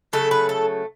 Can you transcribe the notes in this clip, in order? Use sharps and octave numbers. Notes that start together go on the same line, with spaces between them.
C#3 F#3 A3 A4
B4
A4